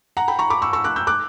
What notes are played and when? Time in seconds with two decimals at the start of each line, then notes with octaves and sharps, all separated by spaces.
0.17 F#5 A#5
0.28 G5 B5
0.39 A#5 C#6
0.50 B5 D6
0.62 C#6 E6
0.73 C#6 E6
0.84 D6 F#6
0.96 E6 G6
1.07 D6 F#6